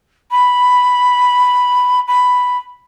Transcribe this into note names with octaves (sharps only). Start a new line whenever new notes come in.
B5
B5